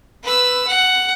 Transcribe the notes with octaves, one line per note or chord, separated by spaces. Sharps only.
B4 E6
F#5